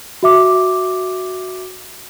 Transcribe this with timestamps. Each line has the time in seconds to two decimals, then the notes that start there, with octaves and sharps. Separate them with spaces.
0.23 F#4 E5 D6